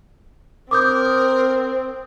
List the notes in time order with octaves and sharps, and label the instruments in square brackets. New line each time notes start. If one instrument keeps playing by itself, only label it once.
[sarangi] C4 [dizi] A#4 [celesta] D6 D#6 G6